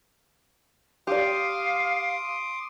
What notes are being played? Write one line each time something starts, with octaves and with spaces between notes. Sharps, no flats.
G4 D5 F5 C6 D6 D#6